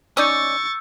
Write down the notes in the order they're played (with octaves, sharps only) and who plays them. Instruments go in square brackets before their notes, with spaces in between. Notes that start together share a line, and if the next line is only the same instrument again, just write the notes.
[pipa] C#4 D#4 D5 [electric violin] C#6 A6 [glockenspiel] E6 G6